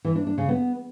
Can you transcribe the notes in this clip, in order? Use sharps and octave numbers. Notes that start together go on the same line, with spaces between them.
E3
D4
D4
C#3
B3